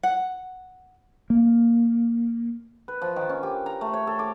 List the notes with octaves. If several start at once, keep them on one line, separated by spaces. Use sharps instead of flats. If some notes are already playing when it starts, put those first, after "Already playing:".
F#5
A#3
B4
F3
D#3
C#4
G4
A#5
A3
C#5
A4
D6